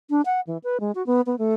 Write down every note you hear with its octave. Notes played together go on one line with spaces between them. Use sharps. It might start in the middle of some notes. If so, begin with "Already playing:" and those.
D4
F#5
E3
B4
G#3
F#4
B3
B3
A3